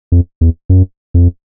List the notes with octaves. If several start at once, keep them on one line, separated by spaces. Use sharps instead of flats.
F2
E2
F#2
F2